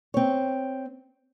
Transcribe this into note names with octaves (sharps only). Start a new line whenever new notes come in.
C4 C#5